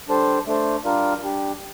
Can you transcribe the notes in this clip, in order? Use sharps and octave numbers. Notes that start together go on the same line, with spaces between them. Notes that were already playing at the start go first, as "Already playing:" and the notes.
G3 D4 A4 C5
A3 D4 A4 C5
G3 D4 F4 A#4
G3 D4 G4